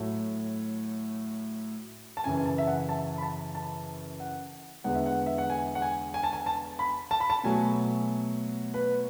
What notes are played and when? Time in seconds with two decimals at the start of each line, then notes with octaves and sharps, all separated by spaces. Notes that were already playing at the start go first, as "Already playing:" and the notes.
Already playing: A2 F#3 A3
2.17 A5
2.24 F#2 C#3 E3 G#5
2.37 G#5
2.46 A5
2.58 E5
2.67 F#5
2.89 A5
3.18 B5
3.22 A5
3.55 A5
4.20 F#5
4.84 E2 D3 G#3 B3 F#5
4.95 E5
5.06 F#5
5.26 E5
5.38 F#5
5.50 G#5
5.75 F#5
5.82 G#5
6.14 G#5
6.23 A5
6.33 G#5
6.46 A5
6.79 B5
7.11 A5
7.20 B5
7.30 A5
7.44 B2 F#3 A3 G#5
8.74 B4